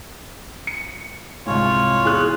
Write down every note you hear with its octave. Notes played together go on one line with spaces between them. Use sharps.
C#7
C2 G#2 F4 C#5
E2 G#4 F#6